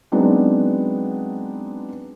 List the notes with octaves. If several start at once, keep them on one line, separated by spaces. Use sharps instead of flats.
F#3 G#3 B3 C4 D4 D#4